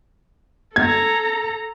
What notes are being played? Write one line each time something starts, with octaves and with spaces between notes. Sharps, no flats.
A4 A#5 G#6